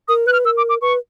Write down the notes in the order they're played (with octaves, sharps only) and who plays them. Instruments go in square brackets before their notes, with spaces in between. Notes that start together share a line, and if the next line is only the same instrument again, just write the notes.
[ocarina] A#4 [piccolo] D#6
[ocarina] B4 [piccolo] F#6
[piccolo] F6
[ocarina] A#4 [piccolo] E6
[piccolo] D6
D6
[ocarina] B4 [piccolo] C#6